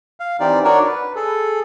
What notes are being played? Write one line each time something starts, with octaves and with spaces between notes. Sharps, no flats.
F5
E3 C4 D#4 G4 D5
D4 D#4 F#4 A#4 C#5 D5
B4
G#4 A4